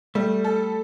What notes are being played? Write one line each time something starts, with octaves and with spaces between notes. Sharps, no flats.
G3 A3
A4